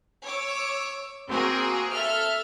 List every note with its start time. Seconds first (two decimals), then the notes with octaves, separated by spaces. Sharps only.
0.24 C#5 D6 E6
1.30 A#3 C4 F#4 G#4 A#4
1.93 A4 E5 F6